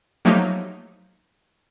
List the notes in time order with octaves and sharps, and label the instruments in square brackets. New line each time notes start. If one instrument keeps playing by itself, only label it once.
[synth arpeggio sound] F3 F#3 A3 A#3 D#4 G4